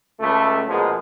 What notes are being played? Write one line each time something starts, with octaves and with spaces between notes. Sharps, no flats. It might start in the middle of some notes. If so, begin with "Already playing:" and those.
C#2 A3
A#1 B2 F3 G#3 G#4 A#4